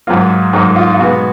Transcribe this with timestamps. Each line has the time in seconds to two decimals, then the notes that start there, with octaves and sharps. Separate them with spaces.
0.07 G#2 F#3 A#3 F4
0.53 G#2 F#3 A#3 D#4
0.76 F4
0.94 F4
0.99 B2 G#3 B3 F#4